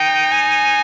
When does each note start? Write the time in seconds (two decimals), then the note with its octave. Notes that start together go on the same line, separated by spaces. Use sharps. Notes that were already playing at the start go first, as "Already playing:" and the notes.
Already playing: D#4 G5
0.32 G#5